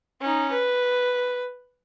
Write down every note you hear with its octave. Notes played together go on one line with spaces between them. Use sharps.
C#4 D#4
B4